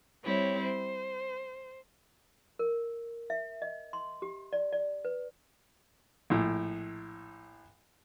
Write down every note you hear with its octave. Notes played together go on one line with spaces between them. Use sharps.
G3 C4 E4 C#5
C5
A#4
E5
D#5
C6
G4
D5
D5
B4
A#1 A2